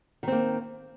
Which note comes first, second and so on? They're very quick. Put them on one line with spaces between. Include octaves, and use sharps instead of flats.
D#3 C4 A#3